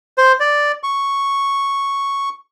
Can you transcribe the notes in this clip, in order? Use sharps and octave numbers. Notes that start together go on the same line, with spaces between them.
C5
D5
C#6